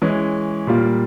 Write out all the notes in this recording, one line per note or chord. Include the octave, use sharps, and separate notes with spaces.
E3 G#3 C#4
A#2 G3 A#3 F4